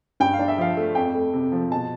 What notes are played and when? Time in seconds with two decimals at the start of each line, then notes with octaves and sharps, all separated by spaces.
0.20 G2 G5
0.33 F5
0.39 D4
0.48 E5
0.58 F3 F5
0.77 A3
0.95 F2 G5
1.15 A3
1.34 C3
1.52 F3
1.71 B2 A5